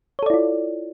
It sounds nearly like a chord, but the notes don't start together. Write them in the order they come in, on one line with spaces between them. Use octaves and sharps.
C#5 A4 D5 E4 F4